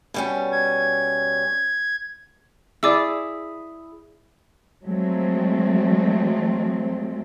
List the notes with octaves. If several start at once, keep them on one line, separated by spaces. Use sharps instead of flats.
B2 G3 C#4
G#6
E4 G#4 D5 D6 E6
F3 F#3 G#3 A3 C4